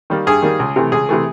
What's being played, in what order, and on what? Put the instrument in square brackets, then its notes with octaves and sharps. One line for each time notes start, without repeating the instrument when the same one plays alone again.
[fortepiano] D#3 G3 A#3
G2 G#4
D#3 G3 A#3
C#2
C3 E3 A3
C#2 G#4
C3 E3 A3